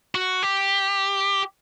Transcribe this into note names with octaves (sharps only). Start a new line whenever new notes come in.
F#4
G4